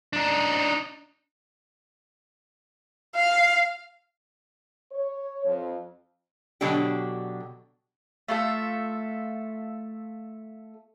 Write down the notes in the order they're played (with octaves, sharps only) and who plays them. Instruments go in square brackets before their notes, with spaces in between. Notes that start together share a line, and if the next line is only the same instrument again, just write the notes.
[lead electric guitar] D4 D#4
[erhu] F5
[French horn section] C#5
F2
[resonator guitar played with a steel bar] B2 D3 F#3 D4 G4
[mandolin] A3 F4 A4 E5